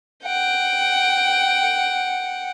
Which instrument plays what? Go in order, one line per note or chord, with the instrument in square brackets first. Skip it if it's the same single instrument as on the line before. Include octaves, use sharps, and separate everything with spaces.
[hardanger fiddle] F#5 G5